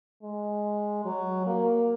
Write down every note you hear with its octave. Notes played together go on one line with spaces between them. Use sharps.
G#3
F#3
A#3